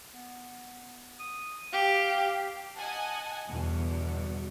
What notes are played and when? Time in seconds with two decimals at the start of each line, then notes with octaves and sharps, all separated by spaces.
0.12 B3
1.19 D#6
1.73 G4 F5
2.76 D#5 F#5 G#5 A5
3.48 E2 G2 B2 D3